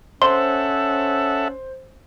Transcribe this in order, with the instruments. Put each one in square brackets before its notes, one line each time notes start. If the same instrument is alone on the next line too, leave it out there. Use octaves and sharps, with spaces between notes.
[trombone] C#4 [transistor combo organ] A4 E5 F#5 [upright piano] C5 [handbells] C6